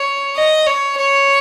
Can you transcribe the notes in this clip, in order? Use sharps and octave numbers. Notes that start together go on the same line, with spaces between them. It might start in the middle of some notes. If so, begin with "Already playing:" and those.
Already playing: C#5
D#5
C#5
C#5